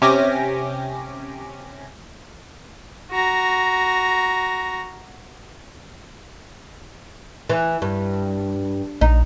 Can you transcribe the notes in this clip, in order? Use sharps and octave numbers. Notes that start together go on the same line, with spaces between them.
C3 C#4 G4 G#5 D6 A#6
F#4 A#5
E3
G2
A#1 D#4